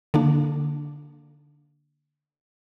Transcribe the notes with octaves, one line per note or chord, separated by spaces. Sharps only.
D3 A#3 D4